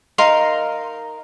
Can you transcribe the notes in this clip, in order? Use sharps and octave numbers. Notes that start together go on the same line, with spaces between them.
D#4 A#4 F5 C6